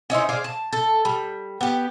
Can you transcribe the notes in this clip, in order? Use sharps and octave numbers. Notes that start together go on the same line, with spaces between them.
C#4 D#4 E4 C5
G#4 C5 D5 F5
A5
A4
G3
B3 G4